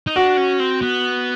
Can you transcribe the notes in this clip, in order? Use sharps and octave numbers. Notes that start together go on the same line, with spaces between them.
D#4
D4 F#4
C#4
C4
B3